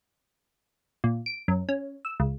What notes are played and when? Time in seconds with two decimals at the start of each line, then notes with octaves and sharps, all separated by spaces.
1.04 A#2
1.26 D7
1.48 F#2
1.69 C#4
2.05 E6
2.20 C#2